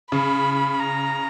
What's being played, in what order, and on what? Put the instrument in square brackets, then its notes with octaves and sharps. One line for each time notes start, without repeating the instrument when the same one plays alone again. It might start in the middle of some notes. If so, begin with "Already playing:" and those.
[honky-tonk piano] C#3 [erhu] B5
[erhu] A#5